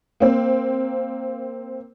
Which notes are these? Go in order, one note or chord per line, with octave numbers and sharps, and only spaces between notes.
A#3 C4